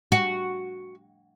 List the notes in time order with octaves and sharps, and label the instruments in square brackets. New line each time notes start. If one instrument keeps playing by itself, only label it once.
[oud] F#4